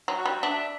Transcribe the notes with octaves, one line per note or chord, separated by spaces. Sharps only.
F#3
F#4
G3
D4 E5